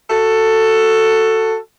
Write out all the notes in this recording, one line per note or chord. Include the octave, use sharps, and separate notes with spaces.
F#4 A4